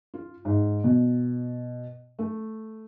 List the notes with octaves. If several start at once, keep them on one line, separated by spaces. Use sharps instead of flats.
F4
G#2
B2
A3